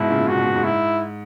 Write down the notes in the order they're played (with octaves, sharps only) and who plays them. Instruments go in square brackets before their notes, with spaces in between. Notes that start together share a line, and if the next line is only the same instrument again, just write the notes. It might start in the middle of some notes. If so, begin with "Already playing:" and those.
Already playing: [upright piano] G#2 B2 [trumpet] E4
[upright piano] A#2 C#3
[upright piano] A#2 C#3 [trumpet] F#4
[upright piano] G#2 B2
A#2
G#2
[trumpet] E4